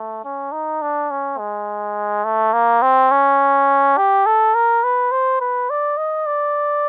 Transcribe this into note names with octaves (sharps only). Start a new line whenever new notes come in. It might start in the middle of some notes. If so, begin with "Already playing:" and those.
Already playing: A3
C#4
D#4
D4
C#4
G#3
A3
A#3
C4
C#4
G4
A4
A#4
B4
C5
B4
D5
D#5
D5